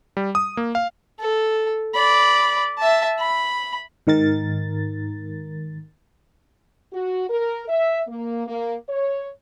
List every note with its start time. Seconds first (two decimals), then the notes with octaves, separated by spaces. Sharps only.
0.17 G3
0.35 D#6
0.57 A#3
0.75 F5
1.20 A4
1.94 D5 B5
2.79 E5 A5
3.19 B5
4.07 G#2 D#3 A#4 A6
6.93 F#4
7.30 A#4
7.69 E5
8.08 A#3
8.47 A#3
8.89 C#5